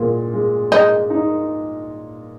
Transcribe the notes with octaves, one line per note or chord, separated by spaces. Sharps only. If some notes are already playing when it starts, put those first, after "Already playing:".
Already playing: A#2 G#3
G#3
G#3 D#4
D#4